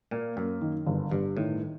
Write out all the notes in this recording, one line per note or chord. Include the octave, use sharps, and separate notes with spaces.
A#2 A#3
F#2 A#3
D#3
G1
G1 G2
A2 D#3